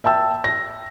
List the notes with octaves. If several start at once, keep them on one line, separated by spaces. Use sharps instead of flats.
E5 G5 A5 E6
A#6